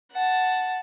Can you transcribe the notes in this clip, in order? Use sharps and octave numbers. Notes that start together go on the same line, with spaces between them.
F#5 A5